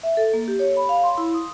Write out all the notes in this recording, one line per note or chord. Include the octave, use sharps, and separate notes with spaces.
E5
A4
A#3
G4
C#5
B5
F5
C6
E4
D#6